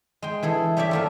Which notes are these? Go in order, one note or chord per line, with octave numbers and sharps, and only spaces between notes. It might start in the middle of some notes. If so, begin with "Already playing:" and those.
G#3 G5
E3 G#4 A4
G3 G4 C#5 D5 E5
F3 A3 A#3